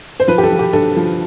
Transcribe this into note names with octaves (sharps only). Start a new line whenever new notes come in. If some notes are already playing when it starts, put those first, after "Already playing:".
C5
F3 B4
G4
A4
F3
G4
G2 A4
F3